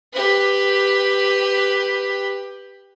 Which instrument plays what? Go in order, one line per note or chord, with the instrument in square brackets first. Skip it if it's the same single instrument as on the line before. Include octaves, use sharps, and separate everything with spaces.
[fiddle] G4 B4